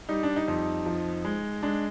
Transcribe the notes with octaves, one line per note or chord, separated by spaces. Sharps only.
G3 D#4
D4
D#4
F2
F3
G#3
G#3 D4